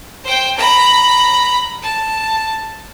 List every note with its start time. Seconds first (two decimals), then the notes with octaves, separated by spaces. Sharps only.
0.24 C5 G5
0.57 A#5 B5
1.82 A5